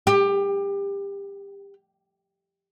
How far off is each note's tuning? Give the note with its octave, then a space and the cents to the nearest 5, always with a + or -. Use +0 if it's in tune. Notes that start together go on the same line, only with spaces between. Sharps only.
G4 +25